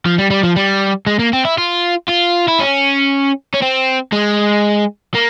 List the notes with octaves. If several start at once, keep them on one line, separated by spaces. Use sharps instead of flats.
F3
G3
G3
F3
G3
G#3
A#3
C4
E4
F4
F4
E4
C#4
C#4
C4
G#3
A#3